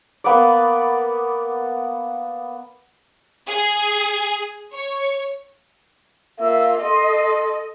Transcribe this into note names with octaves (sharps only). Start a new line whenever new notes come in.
A#3 B3 B4 D5
G#4
C#5
A#3 F4 E5
A4 D#5 C6